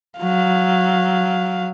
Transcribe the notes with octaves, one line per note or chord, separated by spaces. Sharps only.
F#3 F5